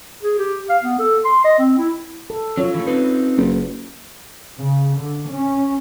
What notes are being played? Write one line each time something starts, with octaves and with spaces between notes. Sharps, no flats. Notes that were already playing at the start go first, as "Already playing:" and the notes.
G#4
G4
F5
B3
A4
C6
D#5
C4
E4
A4
F#3 C#4 F4 C#5
E3 A3
C4 D#4 B4
F#1
C#3
D3
C#4